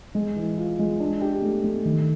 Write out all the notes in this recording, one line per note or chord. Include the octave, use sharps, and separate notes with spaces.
G#3
E3
F4
G#3
D4
G4
A3
A3
D#3